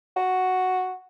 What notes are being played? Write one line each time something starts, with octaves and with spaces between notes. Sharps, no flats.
F#4